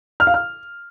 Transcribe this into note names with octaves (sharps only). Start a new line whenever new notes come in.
F6
F5
F6